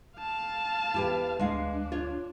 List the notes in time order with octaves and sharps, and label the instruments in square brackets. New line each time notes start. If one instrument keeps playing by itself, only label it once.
[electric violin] F5 A5
[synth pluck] E2 [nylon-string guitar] E4 G4 B4
[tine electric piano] D2 [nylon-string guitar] G#3 F5 [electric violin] D4
[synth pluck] F4 [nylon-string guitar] C#5